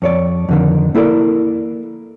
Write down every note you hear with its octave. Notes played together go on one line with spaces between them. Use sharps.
F2 C#5 D5
F2 D3 D#3
A#3 E4 A4 A#4 D5